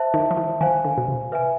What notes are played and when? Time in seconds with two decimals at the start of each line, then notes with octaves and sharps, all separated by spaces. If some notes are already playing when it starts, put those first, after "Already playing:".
Already playing: C5 E5 A5
0.14 D#3
0.31 F3
0.37 E3
0.61 D#3 C5 F5 G#5
0.85 D3
0.98 B2
1.08 C3
1.32 B4 E5 G#5